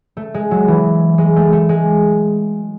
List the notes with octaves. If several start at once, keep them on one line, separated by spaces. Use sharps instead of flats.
A3
G#3
F#3
E3
G#3
A3
A3
G#3